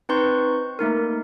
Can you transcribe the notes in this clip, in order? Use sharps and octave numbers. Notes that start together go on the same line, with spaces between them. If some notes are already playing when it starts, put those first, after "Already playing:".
C4 D#4 B4 C6 C#6 G6
A3 A#3 D#4 A#4